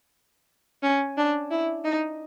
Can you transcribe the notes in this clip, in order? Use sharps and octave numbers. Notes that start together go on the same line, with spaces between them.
C#4
D4
E4
D#4